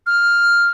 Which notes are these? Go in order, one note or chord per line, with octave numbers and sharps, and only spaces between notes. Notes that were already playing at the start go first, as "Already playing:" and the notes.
F6